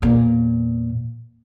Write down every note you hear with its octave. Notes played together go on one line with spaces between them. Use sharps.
E2 A#2